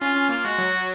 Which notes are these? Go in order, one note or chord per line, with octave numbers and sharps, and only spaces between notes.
C#4 F4
C#4
A#3 F4
G#3 F#4
F#3